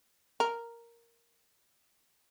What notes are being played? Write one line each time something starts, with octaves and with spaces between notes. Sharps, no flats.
A#4